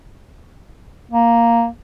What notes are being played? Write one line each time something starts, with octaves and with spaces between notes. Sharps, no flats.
A#3